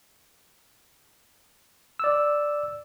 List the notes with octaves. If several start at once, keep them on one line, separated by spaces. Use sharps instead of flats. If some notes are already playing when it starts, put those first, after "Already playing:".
D5 E6